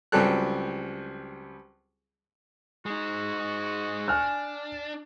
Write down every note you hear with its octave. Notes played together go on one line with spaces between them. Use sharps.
C#2 F#3 G3 C4 A4 F#6
G#3 D#4 F#4
D4 G#5 F6 F#6